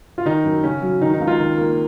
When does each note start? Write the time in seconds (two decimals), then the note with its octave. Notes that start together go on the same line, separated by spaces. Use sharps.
0.18 F4
0.25 D#3 D#4
0.44 F#2
0.63 C#3 C#4
0.82 F#3
1.01 D#3 D#4
1.13 D#4
1.21 C#2
1.27 F4
1.39 D#3
1.58 A#3